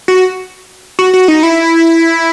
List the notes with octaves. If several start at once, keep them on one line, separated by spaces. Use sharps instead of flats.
F#4
F#4
F#4
D#4
E4